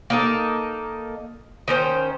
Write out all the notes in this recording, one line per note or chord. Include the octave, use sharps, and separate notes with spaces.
A#3 D#4 A4
D#3 C#4 C5